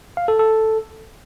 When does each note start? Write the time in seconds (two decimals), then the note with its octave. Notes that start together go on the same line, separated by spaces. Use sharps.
0.17 F5
0.28 A4
0.39 A4